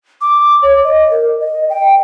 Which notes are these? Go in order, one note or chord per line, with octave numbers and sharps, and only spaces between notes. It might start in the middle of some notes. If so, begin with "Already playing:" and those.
D6
C#5
D#5
A#4
D#5
G5